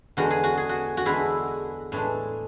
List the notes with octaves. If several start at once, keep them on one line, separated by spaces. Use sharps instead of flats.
E2 D3 G#3 F#4
G#4
F#4
G#4
F#4
F#4
E2 D3 G#3 E4
A2 E3 G#3 D4